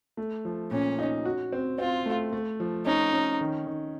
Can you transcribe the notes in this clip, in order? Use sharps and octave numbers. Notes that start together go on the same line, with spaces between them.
A3
F3
A#2 C#4
D#4
F#4
C4
C4 F4
A3
A3
F3
C#4 D#4
C#4
D#3
D#3